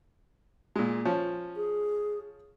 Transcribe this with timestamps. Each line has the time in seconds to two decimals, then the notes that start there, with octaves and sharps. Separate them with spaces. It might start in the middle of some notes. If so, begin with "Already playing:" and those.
0.76 A#2 G#3
1.05 F3 C#4
1.56 G#4